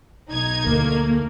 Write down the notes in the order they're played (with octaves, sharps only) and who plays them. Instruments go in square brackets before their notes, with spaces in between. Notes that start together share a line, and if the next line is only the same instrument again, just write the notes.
[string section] B1 D#4 G#6
[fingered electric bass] D2 [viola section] A3 A#3